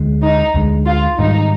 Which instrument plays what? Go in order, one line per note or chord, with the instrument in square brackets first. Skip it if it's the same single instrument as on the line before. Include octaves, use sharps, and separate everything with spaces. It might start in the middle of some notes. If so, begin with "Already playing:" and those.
Already playing: [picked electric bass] D2 D3 G#3
[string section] D#4
[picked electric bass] D2 D3 G#3
[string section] F4
[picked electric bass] G#2 D#3 G3 [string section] D#4